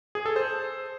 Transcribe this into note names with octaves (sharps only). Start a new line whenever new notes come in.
G#4
A4
C5